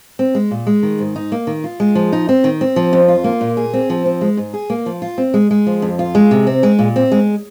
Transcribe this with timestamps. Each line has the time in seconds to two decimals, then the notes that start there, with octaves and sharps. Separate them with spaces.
0.19 C4
0.35 G#3
0.51 A#2
0.67 G#3
0.83 D#3
0.99 G#2
1.16 D#4
1.32 A#3
1.47 D#3
1.64 F4
1.80 G#3
1.95 F3
2.13 D#4
2.29 C4
2.44 D#3
2.61 C4
2.76 F3
2.93 F2
3.08 F4
3.24 A#3
3.41 A#2
3.57 G#4
3.73 C4
3.90 F3
4.06 C4
4.21 G#3
4.37 G#2
4.54 G#4
4.70 A#3
4.86 F3
5.02 F4
5.18 C4
5.34 G#3
5.51 G#3
5.67 F3
5.82 F2
5.99 F4
6.15 G#3
6.31 C3
6.47 C4
6.63 G#3
6.79 A#2
6.96 C4
7.12 G#3